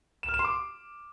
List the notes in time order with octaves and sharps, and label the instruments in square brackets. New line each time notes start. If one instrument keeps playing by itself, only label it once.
[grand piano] E7
F6
E7
C6
D6